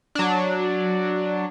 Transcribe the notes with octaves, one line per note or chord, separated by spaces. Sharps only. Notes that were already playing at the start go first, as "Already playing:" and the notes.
F#3 D4